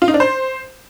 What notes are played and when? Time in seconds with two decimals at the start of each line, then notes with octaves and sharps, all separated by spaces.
0.02 F4
0.08 D#4
0.14 D4
0.20 C5